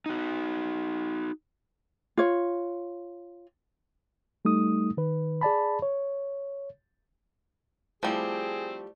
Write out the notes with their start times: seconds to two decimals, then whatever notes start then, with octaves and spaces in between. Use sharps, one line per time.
0.06 D#4 F#4
2.17 F4 C#5
4.45 G3 A3 D#4 D#6
4.97 D#3 B4
5.41 G#4 D5 A5 B5
5.82 C#5
8.03 F3 G3 A3 C4 E4 G#4